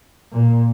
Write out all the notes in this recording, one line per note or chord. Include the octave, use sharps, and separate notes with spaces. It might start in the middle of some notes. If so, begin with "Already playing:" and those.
A#2